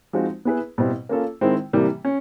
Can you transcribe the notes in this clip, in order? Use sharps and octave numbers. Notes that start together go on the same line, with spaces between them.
F3 G#3 C4 D#4 F#4
B3 E4 G#4 B4
B2 G3 C4 E4
A#3 C#4 F4 A4
D#3 G#3 C4 E4
C3 E3 G3 A#3
C#4